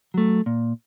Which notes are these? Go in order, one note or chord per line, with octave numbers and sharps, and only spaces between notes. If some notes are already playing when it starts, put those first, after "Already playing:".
F#3 A3
A#2